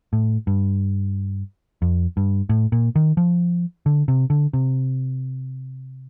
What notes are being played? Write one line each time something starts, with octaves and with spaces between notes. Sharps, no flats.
A2
G2
F2
G2
A2
A#2
D#3
F3
D3
C3
D3
C3